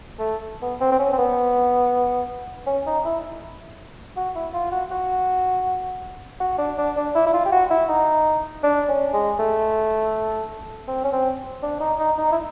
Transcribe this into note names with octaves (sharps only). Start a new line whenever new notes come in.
A3
B3
C4
C4
C#4
C4
B3
C#4
D#4
E4
F#4
E4
F4
F#4
F#4
F#4
D4
D4
D4
E4
E4
F4
G4
F#4
E4
D#4
D4
C#4
G#3
A3
C4
C#4
C4
D4
D#4
D#4
D#4
E4